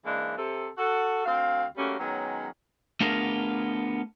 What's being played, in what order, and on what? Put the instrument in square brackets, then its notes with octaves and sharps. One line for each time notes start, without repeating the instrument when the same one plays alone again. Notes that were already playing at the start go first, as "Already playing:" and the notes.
[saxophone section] C#3 E3 G#3 A#3 D4
C3 A4
F#4 A4
D2 C4 F5
G3 A3 A#3 C#4 F#4
D#3 F#3 G#3 B3 C#4
[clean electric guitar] A3 B3 D4 F4 G#4 A#4